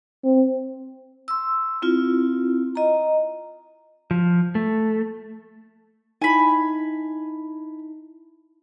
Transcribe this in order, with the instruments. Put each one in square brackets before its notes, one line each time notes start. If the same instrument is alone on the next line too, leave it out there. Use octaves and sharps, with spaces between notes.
[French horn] C4
[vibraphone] C6 E6
C4 E4 F4
D#5 A#5
[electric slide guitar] F3
A3
[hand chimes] D#4 E4 [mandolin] G#5 B5